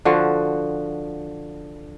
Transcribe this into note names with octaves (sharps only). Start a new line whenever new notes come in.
D3 F3 F#4